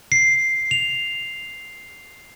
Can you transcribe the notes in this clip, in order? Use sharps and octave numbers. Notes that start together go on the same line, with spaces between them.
C7
F7